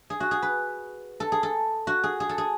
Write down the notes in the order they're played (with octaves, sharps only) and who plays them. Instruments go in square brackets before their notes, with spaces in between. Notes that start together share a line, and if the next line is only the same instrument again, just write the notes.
[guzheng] G#4
F#4
G#4
B4
A4
G#4
A4
F#4
G#4
G#4
A4
G#4